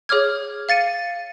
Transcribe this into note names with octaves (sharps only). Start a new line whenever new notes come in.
G#4 C#5 D6 F6 G#6
F5 A6 C#7 D#7